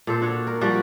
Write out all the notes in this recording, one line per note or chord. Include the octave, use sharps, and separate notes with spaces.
A#2 A4 C5 F5
D4 F#4 C#5
A#4
F3 G3 F#4 D5